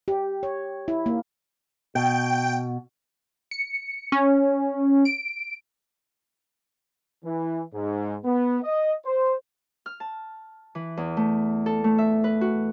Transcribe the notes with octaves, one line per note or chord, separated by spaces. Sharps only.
G4
C#5
E4
A#3
B2 G5
C#7
C#4
D7
E3
G#2
B3
D#5
C5
F6
A5
E3
E2
A3
A4
A3
E5
B4
F#4